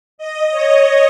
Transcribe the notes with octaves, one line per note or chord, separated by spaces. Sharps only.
D#5
C#5